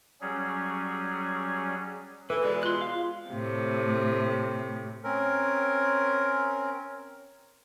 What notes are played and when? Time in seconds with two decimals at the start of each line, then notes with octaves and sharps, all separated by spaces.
0.21 F#3 G3 C#4 G#4
2.30 E3 A4 B4
2.43 B2 E3 G#3 D5
2.63 F4 C6 F#6
2.81 F5
3.29 A2 C3
5.04 C4 C#4 A#4